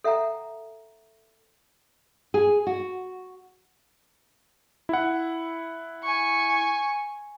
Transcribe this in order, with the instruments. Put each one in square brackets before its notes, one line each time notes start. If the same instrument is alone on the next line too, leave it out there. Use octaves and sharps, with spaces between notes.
[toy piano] A4 E5 F#5 G5 A#5
[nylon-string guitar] G#4
F#4
[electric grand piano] E4 F#5
[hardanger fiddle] G#5 C#6